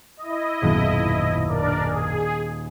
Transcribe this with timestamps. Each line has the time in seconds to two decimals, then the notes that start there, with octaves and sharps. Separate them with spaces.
0.17 E4 D#5
0.62 D#1 A1 F#2 B2
1.47 D4 A#4 D5
1.84 G#4